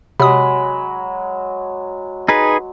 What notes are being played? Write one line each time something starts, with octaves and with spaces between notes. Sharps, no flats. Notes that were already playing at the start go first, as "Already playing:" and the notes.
C3 F#3 G#3 B5 D#6
D#4 G#4 B4